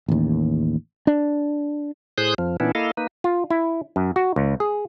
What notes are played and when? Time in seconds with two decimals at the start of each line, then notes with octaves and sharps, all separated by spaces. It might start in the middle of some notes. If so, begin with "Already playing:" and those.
0.08 A1 D#2
1.07 D4
2.18 A2 G#4 C5 D#6 F#6 G6
2.38 F2 F3
2.60 A#2 E3 B3 C#4 D4 E4
2.75 A#3 E4 A4 D#5 F5
2.97 A#3 D#4 B4
3.24 F4
3.50 E4
3.96 F#2
4.16 F#4
4.36 C#2
4.60 G#4